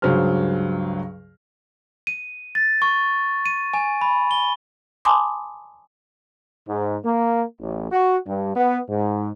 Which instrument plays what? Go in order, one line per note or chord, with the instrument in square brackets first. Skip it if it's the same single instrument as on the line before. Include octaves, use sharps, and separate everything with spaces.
[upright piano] C#2 G2 F#3 G#4 C5 F6
[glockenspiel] D#7
A6
C#6
D#7
G#5
B5
G7
[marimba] G#5 A5 B5 C6 D6 D#6
[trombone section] G#2
A#3
A1
F#4
G2
B3
G#2